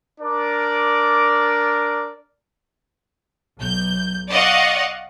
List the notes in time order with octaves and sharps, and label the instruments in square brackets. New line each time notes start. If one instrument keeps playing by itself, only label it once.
[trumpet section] D4 A#4 D5
[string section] B1 G6
D5 D#5 F5 F#5 C#6